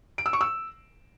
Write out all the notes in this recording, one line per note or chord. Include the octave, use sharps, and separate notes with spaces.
D7
E6
C#6
E6